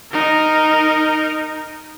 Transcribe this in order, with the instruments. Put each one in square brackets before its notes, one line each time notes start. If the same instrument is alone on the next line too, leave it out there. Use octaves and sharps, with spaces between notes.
[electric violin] D#4 A#4